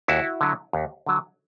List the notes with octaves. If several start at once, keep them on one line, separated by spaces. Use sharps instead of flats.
D#2 E4 F#4
D3 F#3
D#2
D3 F#3